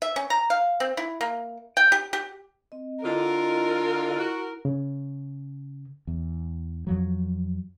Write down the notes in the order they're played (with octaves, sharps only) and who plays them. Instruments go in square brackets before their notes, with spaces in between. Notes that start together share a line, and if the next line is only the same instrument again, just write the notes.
[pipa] E5
C#4
A#5
F5
C4
E4
A#3
G5
G4
G4
[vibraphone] C4 D#5
[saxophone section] D3 F4 [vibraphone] E4 D#5 [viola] A#4
[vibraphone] E4 [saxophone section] F#4
[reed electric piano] C#3
[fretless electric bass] E2
F2 F3 F#3